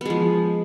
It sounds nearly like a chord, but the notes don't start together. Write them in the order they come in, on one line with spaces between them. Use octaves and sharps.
B3 G#3 F3